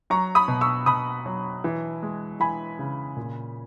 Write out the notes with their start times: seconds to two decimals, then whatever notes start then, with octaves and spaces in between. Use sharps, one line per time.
0.10 F#3 A#5 C#6
0.35 B5 D#6
0.48 B2
0.61 C#6 E6
0.86 B2 B5 D#6
1.26 F#3
1.64 E3
2.02 G#3
2.40 E3 G#5 B5
2.79 C#3
3.17 A#2